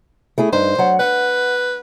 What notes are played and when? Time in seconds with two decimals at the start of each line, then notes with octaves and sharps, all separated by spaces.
0.38 A3 E4 G#4
0.53 G2 D#4 C5
0.78 F#3 F#5
0.99 B4 F#5